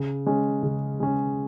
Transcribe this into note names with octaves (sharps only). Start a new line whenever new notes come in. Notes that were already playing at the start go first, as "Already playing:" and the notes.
Already playing: C#3
G#3 C#4
C#3
G#3 C#4